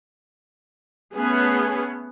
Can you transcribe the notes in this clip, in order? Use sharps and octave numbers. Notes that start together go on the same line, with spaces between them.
A3 B3 C#4 G#4 B4